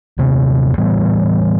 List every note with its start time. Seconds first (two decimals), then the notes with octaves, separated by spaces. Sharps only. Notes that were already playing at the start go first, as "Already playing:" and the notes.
0.18 D#1 C3
0.78 A2 E3 G3 B3